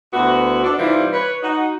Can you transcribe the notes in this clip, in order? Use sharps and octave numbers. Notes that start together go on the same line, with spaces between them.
D2 B3 E4 F#4
D4 A4 D5
C3 E3 G3 C4 D#4 F4
B4 C#5
D#4 F#4